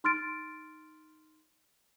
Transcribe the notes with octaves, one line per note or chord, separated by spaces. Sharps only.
D#4 C6 F6 A6 D7